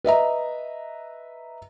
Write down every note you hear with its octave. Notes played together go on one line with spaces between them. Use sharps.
B4 D#5 E5 A#5